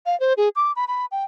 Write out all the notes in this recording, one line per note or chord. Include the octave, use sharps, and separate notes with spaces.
F5
C5
G#4
D6
B5
B5
G5